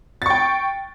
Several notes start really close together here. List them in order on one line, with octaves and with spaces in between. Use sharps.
A6 C#6 G5